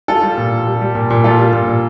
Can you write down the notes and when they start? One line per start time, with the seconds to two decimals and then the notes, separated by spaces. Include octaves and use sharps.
0.08 G3 F4 A4
0.23 G3
0.38 A#2
0.52 A#2
0.67 G3
0.81 G3
0.95 A#2
1.10 A#2
1.24 G3 F4 A4
1.39 G3
1.53 A#2
1.67 A#2